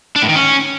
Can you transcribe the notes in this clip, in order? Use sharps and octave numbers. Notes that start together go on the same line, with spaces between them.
D4
A2
D#3
C#4